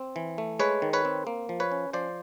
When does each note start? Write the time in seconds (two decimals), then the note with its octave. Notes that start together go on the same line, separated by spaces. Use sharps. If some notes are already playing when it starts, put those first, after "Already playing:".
Already playing: C4
0.16 E3
0.38 A3
0.59 G#3 B4 C#5
0.82 D#3
0.93 B4 C#5
1.05 C4
1.27 A#3
1.49 F3
1.60 B4 C#5
1.72 C#4
1.93 F3 C5 D5